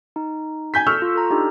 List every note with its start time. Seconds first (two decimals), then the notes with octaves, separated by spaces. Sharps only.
0.16 D#4
0.74 G#5 G6 B6
0.87 A4 C#6 E6 F6
1.02 F4
1.15 A4 A#5
1.30 D4 D#4 G4